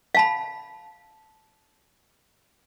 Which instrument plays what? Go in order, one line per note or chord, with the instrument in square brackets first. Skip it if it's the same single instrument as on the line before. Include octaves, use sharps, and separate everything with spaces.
[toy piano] F5 A5 B5